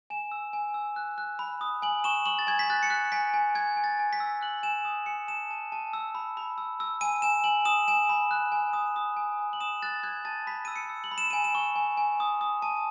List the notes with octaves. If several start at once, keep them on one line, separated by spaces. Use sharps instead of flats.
G#5 E7
E6
G#5
E6
F#6
F#6
B5
D#6
G#5 F#7
C#6 E7
C#6 F#7
A6
G#5 G#6
B6
F#6 A6
C#7
F#6 B6
G#5 B6
G#5
G#5 G#6
G#5
A6
G#5
B6
E6
F#6 F#7
G#5 E7
D#6
G#5 C#7
A5 E7
A5
A5
E6
B5
B5
E6
E6
G#5 D#7
G#5 E7
G#5 F#7
D#6 E7
G#5 E7
B5
F#6
G#5
D#6
D#6
G#5
G#5
F#7
D#6 E7
F#6 A6
F#6 G#6
A5 A6
B5 B6
E6 D#7
C#7
E6
F#7
B5
E7
G#5 D#7
E7
C#6
G#5
G#5
D#6
D#6
A5